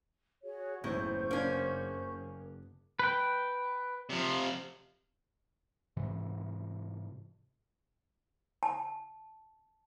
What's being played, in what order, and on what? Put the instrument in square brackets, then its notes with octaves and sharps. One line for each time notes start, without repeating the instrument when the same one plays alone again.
[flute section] F#4 G#4 C#5
[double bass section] F#1 [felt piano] B1 E2 A2 [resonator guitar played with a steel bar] E3 [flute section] C5 C#6 G6
[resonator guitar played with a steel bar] A#3 C#4 [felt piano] B3 D4
[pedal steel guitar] B4 G5
[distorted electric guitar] C3 F3
[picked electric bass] G#2 C3 E3
[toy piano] A5